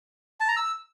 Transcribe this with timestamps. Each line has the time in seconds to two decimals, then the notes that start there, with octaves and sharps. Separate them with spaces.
0.40 A5
0.48 A#5
0.57 E6